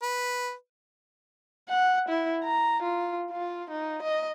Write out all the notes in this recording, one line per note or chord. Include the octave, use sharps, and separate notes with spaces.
B4
F#5
E4
A#5
F4
F4
D#4
D#5